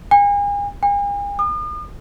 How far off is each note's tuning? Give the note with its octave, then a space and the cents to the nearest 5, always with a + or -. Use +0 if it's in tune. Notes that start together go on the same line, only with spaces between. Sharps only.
G#5 -40
G#5 -45
D#6 -45